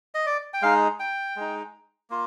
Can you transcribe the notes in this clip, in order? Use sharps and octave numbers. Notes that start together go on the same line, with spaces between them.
D#5
D5
G5
G#3 D#4 F5
G5
G#3 D#4
A#3 F4